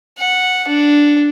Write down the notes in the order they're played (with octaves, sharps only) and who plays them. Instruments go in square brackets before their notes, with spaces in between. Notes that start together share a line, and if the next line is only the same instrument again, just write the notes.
[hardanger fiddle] F#5
D4